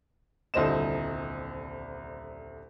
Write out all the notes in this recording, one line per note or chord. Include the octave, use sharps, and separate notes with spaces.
D#1 C2 D3 C5 D#5 E7